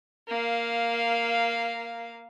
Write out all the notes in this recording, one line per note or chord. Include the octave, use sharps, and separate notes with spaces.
A#3 F5